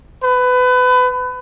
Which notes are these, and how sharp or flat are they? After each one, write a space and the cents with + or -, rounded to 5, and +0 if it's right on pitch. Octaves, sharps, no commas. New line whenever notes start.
B4 +25